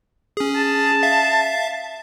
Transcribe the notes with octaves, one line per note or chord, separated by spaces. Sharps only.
C#4 G#4
A5
E5 F5